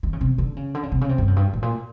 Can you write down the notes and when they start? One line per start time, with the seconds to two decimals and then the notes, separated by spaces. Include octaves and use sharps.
0.03 D#3
0.13 C#3
0.21 C3
0.38 D3
0.56 C#3
0.74 D3
0.83 C#3
0.92 C3
1.01 C#3
1.09 C3
1.18 G2
1.27 F#2
1.36 G2
1.54 A2
1.62 A#2